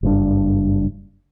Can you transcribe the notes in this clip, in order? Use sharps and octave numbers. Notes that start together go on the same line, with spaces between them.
F#1 G2 D4